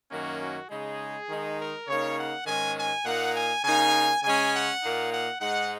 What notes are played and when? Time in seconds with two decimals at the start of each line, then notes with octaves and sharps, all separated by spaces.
0.11 F#2 D#3 A#3 C#4 F#4
0.41 F#4
0.70 C#3 G#3 D#4 G#4
1.29 D#3 G#3 D#4
1.58 A#4
1.88 C#3 A#3 D#4 C#5
2.18 F#5
2.46 G#2 D#3 G#3 C#4 G#5
2.77 G#5
3.05 A#2 A#3 D#4 F#5
3.35 G#5
3.64 C#3 A#3 D#4 G#5
4.23 C#3 G#3 C#4 G#5
4.53 F#5
4.82 A#2 A#3 D#4
5.11 F#5
5.40 G#2 G#3 D#4 F#5